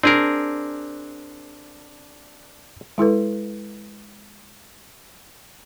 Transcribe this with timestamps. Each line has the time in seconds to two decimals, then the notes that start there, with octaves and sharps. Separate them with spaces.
0.03 C4 D4 G#4 A#4
2.98 G#3 E4 A4 B4